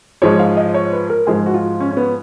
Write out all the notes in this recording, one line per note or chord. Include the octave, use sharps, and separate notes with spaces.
G#2 F3 G#3 C#5
F5
D#5
C#5
B4
A#4
G#2 F3 G#3 G#4
F#4
F4
C#4
C#4
B3